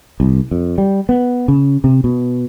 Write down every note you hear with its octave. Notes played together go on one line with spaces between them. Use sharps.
C2
F2
G3
B3
C#3
C3
B2